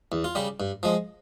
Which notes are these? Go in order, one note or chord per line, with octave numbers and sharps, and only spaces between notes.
E2
F4
C#3 G3 G4
G2
F3 G#3